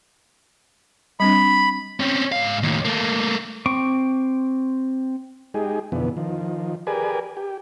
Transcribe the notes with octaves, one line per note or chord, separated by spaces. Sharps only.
G3 C4 D4 B5
C4 C#4
G#2 F5
D#2 A2
A3 A#3
C4 C#6 D6
G#3 D#4 G4 G#4
F2 B2 D3 E3 B3
D#3 F3
G4 G#4 A#4 B4 D5 G#5
G4